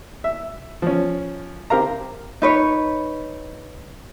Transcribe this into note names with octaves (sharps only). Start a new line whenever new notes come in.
E5
F3 C#4
C4 G4 A#4 F5 A#5
D#4 B4 C#5